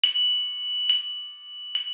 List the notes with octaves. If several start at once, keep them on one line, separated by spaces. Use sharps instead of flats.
F#7
F#7
F#7